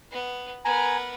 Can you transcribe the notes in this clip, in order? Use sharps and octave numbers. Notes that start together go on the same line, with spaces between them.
B3
B3 A#4 G#5 A#5